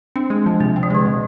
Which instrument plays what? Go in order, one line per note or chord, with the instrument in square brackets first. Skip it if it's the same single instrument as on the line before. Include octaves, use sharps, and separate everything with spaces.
[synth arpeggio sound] C4 [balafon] D4
[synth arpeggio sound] G#3
F3
[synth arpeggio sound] C3 [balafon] C4
[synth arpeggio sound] C4
[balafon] F3
[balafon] D3 [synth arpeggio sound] G#3
[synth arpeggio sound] B2